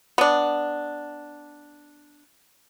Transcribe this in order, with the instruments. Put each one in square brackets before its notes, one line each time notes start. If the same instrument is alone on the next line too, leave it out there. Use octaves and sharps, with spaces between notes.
[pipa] B3 D4